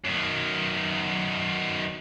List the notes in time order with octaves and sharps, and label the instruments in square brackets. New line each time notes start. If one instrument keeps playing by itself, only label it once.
[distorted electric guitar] F#2 D#3